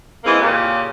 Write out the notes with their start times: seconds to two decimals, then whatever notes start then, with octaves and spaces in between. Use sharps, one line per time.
0.24 E3 G#3 A#3 C4
0.40 A#2 C#3 C#4 G4